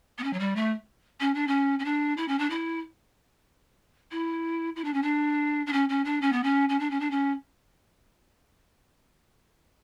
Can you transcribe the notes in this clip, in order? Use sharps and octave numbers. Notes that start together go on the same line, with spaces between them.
B3
C#4
F#3
G3
A3
C#4
D4
C#4
C#4
D4
E4
C#4
D4
E4
E4
E4
D4
C#4
D4
D4
C#4
C#4
D4
C#4
B3
C#4
C#4
D4
C#4
D4
C#4